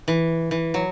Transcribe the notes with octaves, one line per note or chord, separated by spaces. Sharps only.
E3
E3
F#3